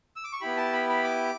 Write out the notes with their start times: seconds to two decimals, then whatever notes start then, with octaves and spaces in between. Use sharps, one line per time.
0.16 E6
0.24 D6
0.33 C#6
0.41 B3 E4 G4 B5
0.57 A5
0.73 B5
0.89 B5
1.04 D6